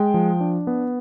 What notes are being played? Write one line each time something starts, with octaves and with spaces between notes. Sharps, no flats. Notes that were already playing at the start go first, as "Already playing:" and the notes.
Already playing: G#3 G5
F3
D4
B3